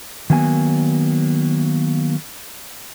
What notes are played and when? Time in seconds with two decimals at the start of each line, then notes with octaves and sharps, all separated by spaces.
0.30 D#3 F#3 A#3 B3 G#5